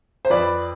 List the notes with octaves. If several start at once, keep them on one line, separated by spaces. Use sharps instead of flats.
C5
F2 B4 D5